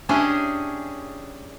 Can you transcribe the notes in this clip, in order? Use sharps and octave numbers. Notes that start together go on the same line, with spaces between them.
C#4 D4 E4 G4 G#4 D#5